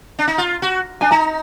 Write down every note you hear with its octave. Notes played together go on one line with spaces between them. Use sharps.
D4
D#4
F4
F#4
D4 G#5
D#4 A#5